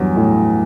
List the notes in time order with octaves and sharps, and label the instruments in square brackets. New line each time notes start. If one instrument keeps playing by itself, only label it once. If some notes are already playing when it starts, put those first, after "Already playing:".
Already playing: [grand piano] E2 F#3 [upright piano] G2
[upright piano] A2